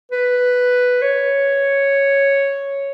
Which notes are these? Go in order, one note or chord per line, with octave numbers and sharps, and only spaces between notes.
B4
C#5